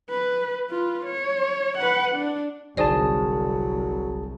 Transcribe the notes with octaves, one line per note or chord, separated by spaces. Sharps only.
B4
F4 B4
C#5
B4 F#5
D4
G1 C2 F#3 D#4 G#4 C5 D5 A5